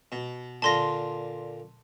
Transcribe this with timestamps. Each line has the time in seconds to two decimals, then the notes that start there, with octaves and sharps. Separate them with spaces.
0.12 B2
0.62 A#2 D3 F4 A5 C6 A#6